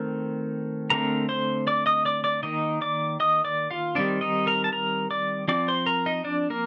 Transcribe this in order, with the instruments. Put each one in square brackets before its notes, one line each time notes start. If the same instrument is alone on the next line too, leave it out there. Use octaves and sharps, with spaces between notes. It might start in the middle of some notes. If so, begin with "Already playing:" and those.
Already playing: [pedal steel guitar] D#3 A3 C4 A#4
D3 A3 C4 A#4 A#5
C5 C6
D5 D6
D#5 D#6
D5 D6
D5 D6
D#3 A#3 D#4 D#5
D5 D6
D#5 D#6
D5 D6
F4 F5
D#3 G3 C4 D4 D5
D#4 D#5
A#4 A#5
A5
A#4 A#5
D5 D6
F3 C4 D5 D6
C5 C6
A#4 A#5
D#4 D#5
D4 D5
A#3 A#4